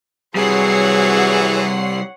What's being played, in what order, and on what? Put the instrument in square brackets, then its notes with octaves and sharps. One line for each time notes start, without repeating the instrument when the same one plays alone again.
[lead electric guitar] C3 G3 [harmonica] E3 F#3 [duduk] G#4 [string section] C#5 F#5 C7